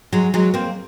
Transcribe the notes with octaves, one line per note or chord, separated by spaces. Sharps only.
F#3 G#3
F#3 G#3
A#3 C4